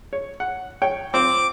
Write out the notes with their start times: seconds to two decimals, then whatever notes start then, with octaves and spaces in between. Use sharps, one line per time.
0.13 C#5
0.40 F#5
0.82 C#5 G5
1.14 C4 F4 D6